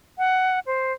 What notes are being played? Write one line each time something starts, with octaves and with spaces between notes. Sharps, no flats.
F#5
C5